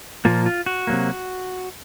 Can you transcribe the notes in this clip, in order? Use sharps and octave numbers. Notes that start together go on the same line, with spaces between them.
A#2 F3 A#3 F4
F4
F#4
C3 F#3 A#3